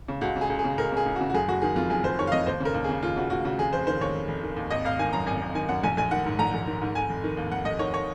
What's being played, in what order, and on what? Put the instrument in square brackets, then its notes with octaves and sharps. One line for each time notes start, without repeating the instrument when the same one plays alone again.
[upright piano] C#3
C#2 F#4
C#3
G#4
C#2
G#4
C#3
C#2 A#4
C#3 G#4
C#2
C#3 F#4
F#4
F#1 G#4
F#1 F#4
D#3 G#4
F2 F4
F#1 G#4
F#1 C5
D#3 C#5
F5
F2 D#5
D#2 C5
C#3 A#4
D#2
C#3 G#4
D#2 F4
C#3 F#4
D#2 F#4
C#3 F#4
F1 G#4
F1 C5
D#3 C5
D#2 C#5
F1
F1
D#3
D#2
G#1 D#5
G#1 F5
D#3 G#5
F#2 A#5
G#1 G#5
G#1
D#3 G#5
F#2 F#5
A#1 G#5
A#1 G#5
D#3 F#5
G#2
A#1 A#5
A#1
D#3
G#2
F1 G#5
F1
D#3
D#2
F1 F#5
F1 D#5
D#3 C#5
C#5